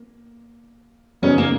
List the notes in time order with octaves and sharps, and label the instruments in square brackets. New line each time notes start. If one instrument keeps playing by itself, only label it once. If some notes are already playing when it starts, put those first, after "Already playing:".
Already playing: [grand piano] A#3
[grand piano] C#3 F#3 B3 D#4 G#4 [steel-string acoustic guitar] C#4
[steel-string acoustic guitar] A#3